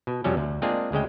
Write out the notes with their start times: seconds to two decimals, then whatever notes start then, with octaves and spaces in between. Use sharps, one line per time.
0.07 B2
0.24 F2 C3 F#3 G3 C#4
0.37 D2
0.62 G#3 A#3 C4 D4 F4 G#4
0.92 D2 C#3 G#3 G5